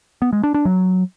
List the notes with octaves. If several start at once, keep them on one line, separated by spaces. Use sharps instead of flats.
B3
G#3
D4
D4
F#3